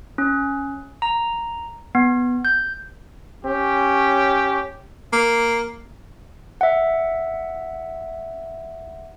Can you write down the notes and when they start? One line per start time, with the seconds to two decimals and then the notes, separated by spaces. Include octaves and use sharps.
0.18 C#4
1.02 A#5
1.95 B3
2.45 G6
3.45 C#4 G4
5.13 A#3
6.61 E5 F#5